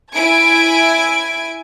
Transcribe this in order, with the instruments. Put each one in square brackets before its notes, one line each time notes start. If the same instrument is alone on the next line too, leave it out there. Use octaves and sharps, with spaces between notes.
[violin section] E4 G#5 G#6 D7